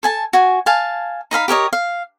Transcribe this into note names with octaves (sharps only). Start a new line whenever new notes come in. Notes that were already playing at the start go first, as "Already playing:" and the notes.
A4 G#5 A5
F#4 G#5
F5 G#5 A5
D#4 D#5 F5 B5
G4 A#4 C#5 D#5
F5